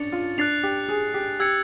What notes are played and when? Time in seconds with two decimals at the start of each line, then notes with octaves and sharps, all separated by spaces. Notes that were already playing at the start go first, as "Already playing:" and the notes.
Already playing: C#4 D4 A6 C#7 F7
0.12 F4
0.38 D4 F#6 A6 C7 F7
0.63 G4
0.89 G#4
1.14 G4
1.39 G4 E6 G#6 C#7